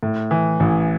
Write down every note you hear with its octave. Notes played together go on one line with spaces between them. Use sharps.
A2
E3
A1